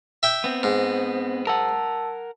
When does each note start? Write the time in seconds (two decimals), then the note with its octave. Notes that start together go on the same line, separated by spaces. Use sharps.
0.23 E5 G5
0.44 B3 C4
0.63 G#2
1.47 A#4 F#5 A5 E6